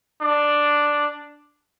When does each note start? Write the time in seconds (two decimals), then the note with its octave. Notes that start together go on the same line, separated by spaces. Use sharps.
0.22 D4